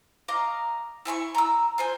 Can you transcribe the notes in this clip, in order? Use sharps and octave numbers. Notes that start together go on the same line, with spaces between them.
D#5 F5 A#5 D6
E4 G#5 B5 C#6
A#5 E6
F4 C5 G#5